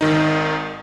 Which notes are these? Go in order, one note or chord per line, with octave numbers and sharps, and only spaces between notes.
G#1 D#3 D#4